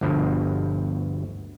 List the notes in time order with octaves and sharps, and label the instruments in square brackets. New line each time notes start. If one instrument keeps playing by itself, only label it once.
[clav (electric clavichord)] G1 D2 G2 B2 F3